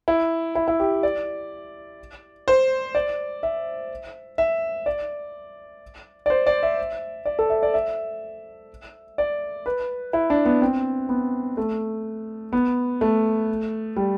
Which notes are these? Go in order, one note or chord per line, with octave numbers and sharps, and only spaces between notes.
E4
E4
E4
G4
D5
C5
D5
E5
E5
D5
D5
C5
D5
E5
D5
A4
E5
D5
E5
D5
B4
E4
D4
B3
C4
B3
A3
B3
A3
G3